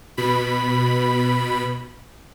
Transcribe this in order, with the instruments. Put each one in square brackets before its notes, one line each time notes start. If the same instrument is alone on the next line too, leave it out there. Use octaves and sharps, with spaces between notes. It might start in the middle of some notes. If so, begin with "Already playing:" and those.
[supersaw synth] B2 B5